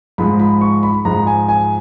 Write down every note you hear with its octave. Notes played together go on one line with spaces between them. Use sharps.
G#2 F3 G#3 B5
B5
C#6
B5
G#2 F3 G#3 A#5
G#5
G#5